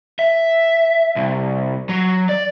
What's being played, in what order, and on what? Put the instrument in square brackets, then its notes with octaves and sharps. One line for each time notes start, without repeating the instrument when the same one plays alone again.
[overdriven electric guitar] E5
C2
F#3
D5